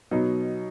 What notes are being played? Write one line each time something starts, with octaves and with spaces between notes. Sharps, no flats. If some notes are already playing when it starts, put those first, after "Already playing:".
B2 F#3 B3 D#4